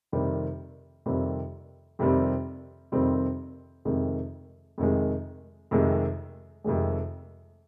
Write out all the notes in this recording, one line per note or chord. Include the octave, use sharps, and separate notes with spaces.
F2 C3 D#3 G3 C4
F2 C3 D#3 G3 C4
F2 C3 D#3 G3 C4
F2 C3 D#3 G3 C4
F2 C3 D#3 G#3
F2 C3 D#3 G#3
F2 C3 D#3 G#3
F2 C3 D#3 G#3